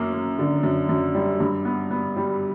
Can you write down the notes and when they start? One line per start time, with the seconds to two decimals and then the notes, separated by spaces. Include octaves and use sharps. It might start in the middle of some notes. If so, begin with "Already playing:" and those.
Already playing: F#2 A#3
0.13 A#3
0.39 D3
0.63 F#2
0.89 F#2
1.15 G3
1.40 G2
1.65 B3
1.91 B3
2.16 G3